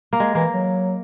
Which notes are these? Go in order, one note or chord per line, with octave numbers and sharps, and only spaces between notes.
A#3
G#3
E3 A#3
F#3